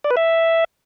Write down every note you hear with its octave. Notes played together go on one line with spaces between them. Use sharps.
D5
B4
E5